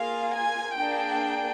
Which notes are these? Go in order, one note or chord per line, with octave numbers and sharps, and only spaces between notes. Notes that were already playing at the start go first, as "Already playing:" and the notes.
Already playing: A#3 F4 G#4 F5
G#5
A#3 D4 G#4 G5